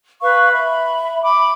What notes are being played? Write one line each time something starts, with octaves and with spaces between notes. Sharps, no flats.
B4 F5 C#6
E5 B5
B5 D6